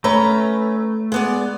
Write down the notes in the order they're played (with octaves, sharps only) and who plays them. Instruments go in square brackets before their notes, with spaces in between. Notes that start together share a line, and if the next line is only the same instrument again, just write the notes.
[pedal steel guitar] A3 [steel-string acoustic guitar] C#4 B4 A#5
[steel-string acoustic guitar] G#3 B3 D5